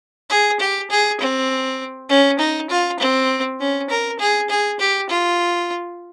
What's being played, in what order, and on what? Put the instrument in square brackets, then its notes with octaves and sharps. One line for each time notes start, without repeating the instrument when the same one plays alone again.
[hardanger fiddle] G#4
G4
G#4
C4
C#4
D#4
F4
C4
C#4
A#4
G#4
G#4
G4
F4